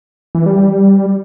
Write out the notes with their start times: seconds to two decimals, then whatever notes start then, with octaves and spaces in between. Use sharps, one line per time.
0.35 E3
0.46 G3
0.57 G3